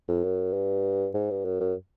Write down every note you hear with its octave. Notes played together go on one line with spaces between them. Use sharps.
F2
F#2
G2
G#2
G2
F#2
F#2